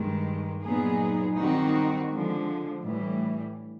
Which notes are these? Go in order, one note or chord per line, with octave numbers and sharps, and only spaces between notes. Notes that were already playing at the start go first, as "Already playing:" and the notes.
Already playing: G2 D#3 G#3
A#2 F#3 B3 D#4 G#4
D#3 G3 C4 D#4 F#4
D3 F3 G#3
A2 E3 G3